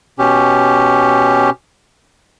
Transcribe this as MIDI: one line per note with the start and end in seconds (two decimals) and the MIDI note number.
0.19 1.50 47
0.19 1.50 61
0.19 1.50 67